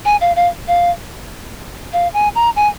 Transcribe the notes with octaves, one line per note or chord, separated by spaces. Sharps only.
G#5
F5
F5
F5
F5
G#5
A#5
G#5